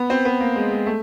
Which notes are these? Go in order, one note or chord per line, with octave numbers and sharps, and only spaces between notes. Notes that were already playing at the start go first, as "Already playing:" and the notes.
Already playing: B3
C4
B3
A#3
G#3
G#3
A3